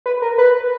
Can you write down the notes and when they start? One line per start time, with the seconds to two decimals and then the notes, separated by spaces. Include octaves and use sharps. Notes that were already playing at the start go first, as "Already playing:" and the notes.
0.06 B4
0.22 A#4
0.38 B4